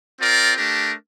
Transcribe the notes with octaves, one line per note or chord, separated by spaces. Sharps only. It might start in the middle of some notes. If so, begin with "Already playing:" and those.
C4 F4 A#4 D5
A3 D4 G4 A#4